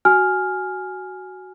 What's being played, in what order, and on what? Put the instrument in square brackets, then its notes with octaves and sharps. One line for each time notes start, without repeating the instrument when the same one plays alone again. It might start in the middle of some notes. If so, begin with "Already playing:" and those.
[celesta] F#4 G#5 F6